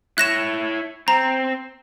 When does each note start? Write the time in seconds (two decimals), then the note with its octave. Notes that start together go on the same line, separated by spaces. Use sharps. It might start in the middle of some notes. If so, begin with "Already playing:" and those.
0.18 E4 C#5 F#6 A#6 E7
1.08 C4 A#5